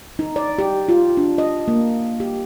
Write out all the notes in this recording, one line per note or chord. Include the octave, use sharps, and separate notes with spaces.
D#4
D5
G4
F4
D4
D#5
A#3
G4